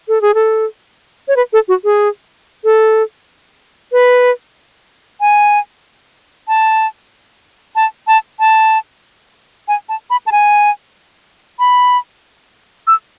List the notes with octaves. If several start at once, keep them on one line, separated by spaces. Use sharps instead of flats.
A4
G#4
A4
C#5
B4
A4
F#4
G#4
A4
B4
G#5
A5
A5
A5
A5
G#5
A5
B5
A5
G#5
B5
E6